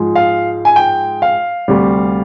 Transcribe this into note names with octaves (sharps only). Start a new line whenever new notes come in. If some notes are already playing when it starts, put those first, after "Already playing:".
Already playing: G#2 F3 G#3
F5
G#5
G5
F5
D2 C3 G3